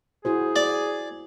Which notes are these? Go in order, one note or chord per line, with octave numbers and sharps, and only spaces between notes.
E4 F#4 G#4 C5
D5